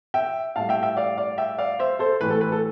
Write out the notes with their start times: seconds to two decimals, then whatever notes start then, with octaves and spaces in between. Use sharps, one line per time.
0.14 E5 G5
0.56 A2 G3 F5 A5
0.69 E5 G5
0.83 E5 G5
0.97 D5 F5
1.18 D5 F5
1.38 E5 G5
1.58 D5 F5
1.79 C5 E5
1.99 A4 C5
2.20 A2 E3 A3 B4
2.30 A4
2.41 B4
2.52 A4